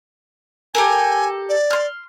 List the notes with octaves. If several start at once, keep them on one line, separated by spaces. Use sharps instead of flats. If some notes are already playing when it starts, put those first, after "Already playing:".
G4 A4 A#4 G#5
D5
C6 F6